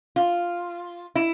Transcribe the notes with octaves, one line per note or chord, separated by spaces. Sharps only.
F4
E4